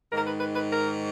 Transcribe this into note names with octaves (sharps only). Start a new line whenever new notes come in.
G#2 D#3 A#4
B4
B4
B4
A#4